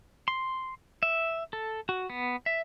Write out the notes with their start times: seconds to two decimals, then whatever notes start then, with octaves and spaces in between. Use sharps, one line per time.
0.28 C6
1.03 E5
1.53 A4
1.89 F#4
2.10 B3
2.46 E5